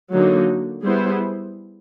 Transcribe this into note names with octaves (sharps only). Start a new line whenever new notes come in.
D3 F#3 A#3 D#4 F#4
G3 B3 E4 G#4 C5